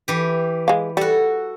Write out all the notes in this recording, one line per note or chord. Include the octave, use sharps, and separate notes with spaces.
E3 G4
G#3 F5
G3 F#4 A4